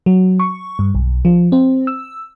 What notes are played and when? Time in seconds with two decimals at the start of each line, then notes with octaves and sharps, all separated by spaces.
0.06 F#3
0.40 C#6
0.79 G2
0.95 B1
1.25 F3
1.52 C4
1.87 E6